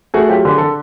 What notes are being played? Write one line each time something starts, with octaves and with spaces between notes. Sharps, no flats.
A3 F#4 G#4
F#3 F4 G4
D3 G#4
D3 A4